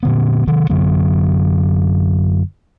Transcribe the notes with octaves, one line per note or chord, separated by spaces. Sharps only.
A#2 D3 B3
C3 D#3
F#2 D3 F#3 C4